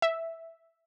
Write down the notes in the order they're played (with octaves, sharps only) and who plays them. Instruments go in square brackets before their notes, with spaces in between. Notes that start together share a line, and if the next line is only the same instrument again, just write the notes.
[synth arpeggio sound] E5